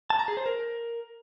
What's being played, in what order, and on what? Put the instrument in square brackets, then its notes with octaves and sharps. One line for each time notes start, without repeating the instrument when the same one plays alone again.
[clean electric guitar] A5
A#5
G#4
C5
A#4